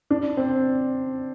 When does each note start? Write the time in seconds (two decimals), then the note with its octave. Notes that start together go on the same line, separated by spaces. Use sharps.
0.10 D4
0.37 C4